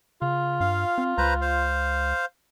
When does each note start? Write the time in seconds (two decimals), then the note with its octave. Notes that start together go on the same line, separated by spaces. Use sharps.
0.22 C#3 F4
0.60 G2 F5
0.98 C4
1.18 C#2 B4 C5 A#5
1.41 C5 F5